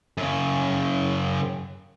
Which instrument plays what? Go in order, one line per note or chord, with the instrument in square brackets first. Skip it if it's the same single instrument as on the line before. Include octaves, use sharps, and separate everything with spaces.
[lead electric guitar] F#2 C#3